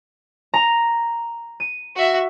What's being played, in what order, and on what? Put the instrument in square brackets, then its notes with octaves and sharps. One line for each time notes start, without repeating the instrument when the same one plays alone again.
[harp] A#5
D#7
[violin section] F#4 E5